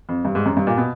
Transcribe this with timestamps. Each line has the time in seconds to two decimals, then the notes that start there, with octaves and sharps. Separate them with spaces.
0.09 F2
0.25 G2
0.35 G#2
0.46 F#2
0.57 G2
0.67 A#2
0.77 B2